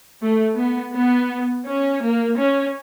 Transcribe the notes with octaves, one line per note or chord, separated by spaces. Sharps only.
A3
B3
B3
C#4
A#3
C#4